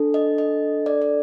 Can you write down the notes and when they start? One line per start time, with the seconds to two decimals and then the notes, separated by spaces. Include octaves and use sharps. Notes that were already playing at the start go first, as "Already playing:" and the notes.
Already playing: D4 A4
0.14 D#5
0.38 D#5
0.86 D5
1.02 D5